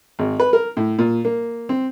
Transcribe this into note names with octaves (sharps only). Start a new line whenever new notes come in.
G#1
B4
A#4
A2
A#2
A#3
C4